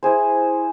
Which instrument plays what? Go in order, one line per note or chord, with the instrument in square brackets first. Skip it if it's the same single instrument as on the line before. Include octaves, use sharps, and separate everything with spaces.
[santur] E4 G#4 C5